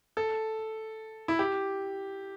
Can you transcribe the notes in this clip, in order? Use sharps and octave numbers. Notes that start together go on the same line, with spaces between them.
A4
E4
G4